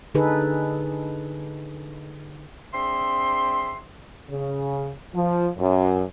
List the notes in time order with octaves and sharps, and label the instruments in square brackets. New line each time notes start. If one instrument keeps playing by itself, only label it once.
[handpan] D3 D#4 G#4 A4 B4
[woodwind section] C4 D4 G#4 E5 C6
[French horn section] C#3
F3
F#2